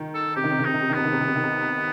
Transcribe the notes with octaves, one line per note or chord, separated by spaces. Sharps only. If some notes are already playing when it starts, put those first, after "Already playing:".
Already playing: D#3
A4
C3 G4
D#3
C3
D#3
C3 D#4
D#3
C3
D#3
C3 B3
D#3
C3
D#3
C3
D#3
C3